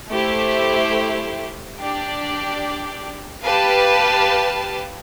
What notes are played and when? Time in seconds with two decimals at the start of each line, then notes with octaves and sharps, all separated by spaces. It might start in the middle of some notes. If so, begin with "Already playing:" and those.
0.10 A3 E4 G4 C5
1.78 D4 G4 D5
3.44 G4 B4 F5 A5